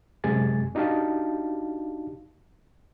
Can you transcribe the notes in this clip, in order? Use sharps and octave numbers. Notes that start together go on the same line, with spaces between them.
F#2 C3 G#3 G#5 A6
D4 D#4 F#4 G4 F5 A5